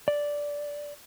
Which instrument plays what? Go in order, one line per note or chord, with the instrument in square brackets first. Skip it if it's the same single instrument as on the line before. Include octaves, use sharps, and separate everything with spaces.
[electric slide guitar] D5